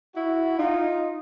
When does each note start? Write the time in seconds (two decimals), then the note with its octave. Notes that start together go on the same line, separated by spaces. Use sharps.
0.16 E4 F#4
0.58 D#4 F4